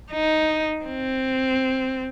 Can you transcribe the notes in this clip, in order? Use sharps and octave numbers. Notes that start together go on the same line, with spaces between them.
D#4
C4